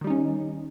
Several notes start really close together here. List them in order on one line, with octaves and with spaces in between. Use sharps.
D#3 G3 D#4 C#4